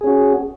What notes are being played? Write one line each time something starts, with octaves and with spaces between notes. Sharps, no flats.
C#4 F#4 G#4